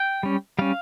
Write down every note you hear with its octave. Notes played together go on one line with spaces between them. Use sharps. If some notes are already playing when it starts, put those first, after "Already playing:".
Already playing: G5
G3 C#4
G3 C#4 F5